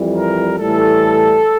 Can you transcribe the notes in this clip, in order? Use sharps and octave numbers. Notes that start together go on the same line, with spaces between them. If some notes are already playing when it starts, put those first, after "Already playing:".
Already playing: F2 E3 G3
A#4
A2 E3 G3 A4